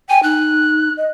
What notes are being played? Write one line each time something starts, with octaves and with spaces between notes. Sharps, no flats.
G5 G#5
D#4 F#6
D#5